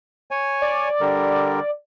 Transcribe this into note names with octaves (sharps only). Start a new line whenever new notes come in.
C#5 G#5
D5
D3 G3 A#4